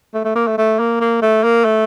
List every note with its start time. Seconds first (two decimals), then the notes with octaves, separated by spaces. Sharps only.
0.14 A3
0.25 A3
0.36 A#3
0.48 A3
0.58 A3
0.79 A#3
1.01 A#3
1.22 A3
1.44 A#3
1.65 A3